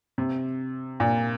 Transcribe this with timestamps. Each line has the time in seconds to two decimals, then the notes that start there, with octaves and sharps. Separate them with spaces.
0.18 C3
1.00 A#2